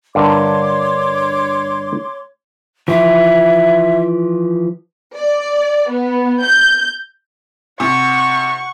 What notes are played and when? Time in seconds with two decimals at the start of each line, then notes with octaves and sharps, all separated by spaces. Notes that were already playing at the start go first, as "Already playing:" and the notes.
0.15 G2 D3 A#4 C#5 C6 D6
2.88 E3 F3 G4 E5
5.15 D5
5.89 B3
6.41 G6
7.80 C3 F#5 C#6